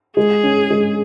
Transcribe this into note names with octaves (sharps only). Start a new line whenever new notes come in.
G#3 G#4
C#4
G#3